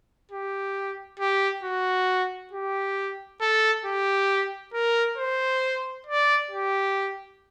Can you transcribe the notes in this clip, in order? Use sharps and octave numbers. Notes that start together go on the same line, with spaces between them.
G4
G4
F#4
G4
A4
G4
A#4
C5
D5
G4